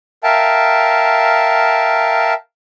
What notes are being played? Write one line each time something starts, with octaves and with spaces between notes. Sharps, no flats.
A#4 E5 F5 G5 A5